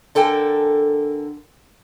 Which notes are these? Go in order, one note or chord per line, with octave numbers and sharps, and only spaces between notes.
D3 A4 A#4 G5 G#5